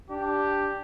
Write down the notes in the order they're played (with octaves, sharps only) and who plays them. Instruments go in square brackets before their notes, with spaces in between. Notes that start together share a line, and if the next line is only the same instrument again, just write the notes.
[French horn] D4 [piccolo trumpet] G4